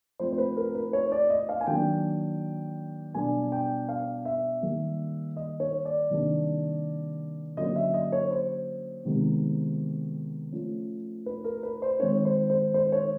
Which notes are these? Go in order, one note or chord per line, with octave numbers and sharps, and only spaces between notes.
F3 A3 C4 C5
C5
B4
A#4
B4
C#5
D5
D#5
F5
G#5
D#3 F#3 A#3 D4 G5
B2 G3 B3 D4 G#5
G5
F5
E5
D#3 G3 A#3
D#5
C#5
D5
C3 D#3 G3 A#3 D4
D3 F#3 A#3 C#4 D#5
E5
D#5
C#5
C5
C3 D#3 G#3 B3
F3 A3 C#4
B4
A#4
B4
C5
D#3 G#3 C4 C#5
C5
C5
C5
C#5